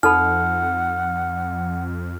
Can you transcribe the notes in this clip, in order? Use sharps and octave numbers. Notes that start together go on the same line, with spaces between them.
F2 D#4 A4 F#5 B5 F6